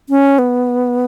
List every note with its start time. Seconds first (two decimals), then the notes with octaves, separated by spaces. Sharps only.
0.09 C#4
0.39 B3